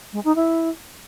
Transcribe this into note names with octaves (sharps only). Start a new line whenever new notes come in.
G#3
D#4
E4